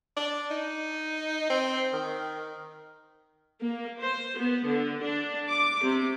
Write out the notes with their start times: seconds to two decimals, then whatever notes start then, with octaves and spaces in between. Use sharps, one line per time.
0.17 D4
0.51 D#4
1.50 C4
1.93 D#3
3.60 A#3
4.01 C5
4.37 B3
4.66 D3
5.02 D4
5.48 D6
5.83 C3